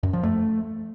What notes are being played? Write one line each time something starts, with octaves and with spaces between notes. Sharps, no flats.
F#2
F3
A3